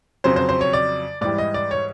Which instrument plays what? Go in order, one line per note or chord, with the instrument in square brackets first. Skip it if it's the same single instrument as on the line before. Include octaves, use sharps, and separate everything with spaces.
[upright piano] F2 C#3 F#3 C5
C5
C5
C#5
D5
G#2 E3 G3 D5
D#5
D5
C#5